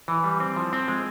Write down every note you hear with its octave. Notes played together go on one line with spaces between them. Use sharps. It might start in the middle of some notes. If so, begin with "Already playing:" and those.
E3
G3
C4
F3
C4
G#3